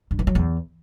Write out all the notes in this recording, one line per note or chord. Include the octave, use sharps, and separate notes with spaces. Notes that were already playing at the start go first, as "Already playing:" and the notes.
G2
E3
F#3
E2